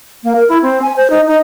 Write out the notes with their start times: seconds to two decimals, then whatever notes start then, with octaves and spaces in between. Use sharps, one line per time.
0.24 A#3
0.36 A#4
0.49 E4
0.62 C4
0.82 G#5
0.97 C5
1.10 D#4
1.27 D#4